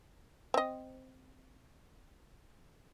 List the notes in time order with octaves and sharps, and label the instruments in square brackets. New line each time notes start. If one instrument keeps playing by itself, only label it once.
[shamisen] C4 D#5